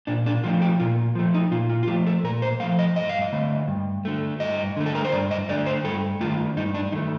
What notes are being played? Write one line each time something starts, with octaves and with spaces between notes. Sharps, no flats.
A#2 D4
D4
F3 A3 F4
G4
A#2 F4
F3 A3
D#4
A#2 F4
F4
F4
F3 A3 G4
A4
A#2 A#4
C5
F3 A3 F5
D#5
G2 D#5
F5
D#5
D3 A3
G2
D3 A3
G2 D#5
D3 A3
A4
A#4
C5
G2 D5
D#5
D3 A3 D5
C5
G2 A4
D#3 A3 F4
G2 D#4
D4
D#3 A3 D#4